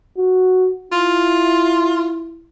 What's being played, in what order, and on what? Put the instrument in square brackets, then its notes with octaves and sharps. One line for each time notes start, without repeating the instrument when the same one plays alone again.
[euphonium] F#4
[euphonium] E4 [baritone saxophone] F4